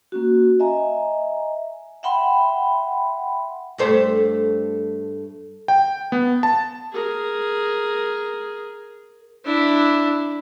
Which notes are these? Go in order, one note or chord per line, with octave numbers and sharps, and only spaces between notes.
A#3 C#4 F#4
D#5 E5 G#5 A#5
E5 F#5 G5 B5 C6
G2 A3 C5
G5
B3
A5
G#4 A#4
D4 E4